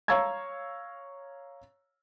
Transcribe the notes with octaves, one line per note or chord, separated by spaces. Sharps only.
C#5 F5 A#5 C#6 E6 G#6